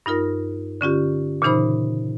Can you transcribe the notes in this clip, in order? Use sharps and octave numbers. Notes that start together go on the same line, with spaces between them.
G2 D#4 F4 A#4
D3 C#4 F4 G4
A#2 C#3 E3 D#4 C5 B5